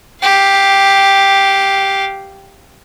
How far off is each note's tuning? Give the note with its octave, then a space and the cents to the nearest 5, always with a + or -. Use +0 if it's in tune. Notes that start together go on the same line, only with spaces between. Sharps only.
G4 +0 F5 +0